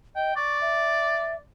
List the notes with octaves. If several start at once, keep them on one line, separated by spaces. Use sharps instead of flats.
D#5 G5
D5 C#6
E5